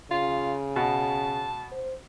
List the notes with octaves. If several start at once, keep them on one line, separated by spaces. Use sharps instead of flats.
C#3 F4
B2 A5
C5